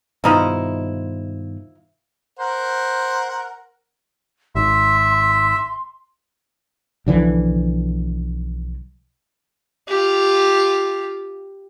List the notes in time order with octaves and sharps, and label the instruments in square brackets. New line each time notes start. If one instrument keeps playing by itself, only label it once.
[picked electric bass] G2 B2 D#3 [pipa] F3 D#4 E4
[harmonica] A#4 C5 F#5
[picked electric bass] G#1 [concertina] E5 [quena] C6
[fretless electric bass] B1 D3 E3 F3
[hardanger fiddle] F4 G4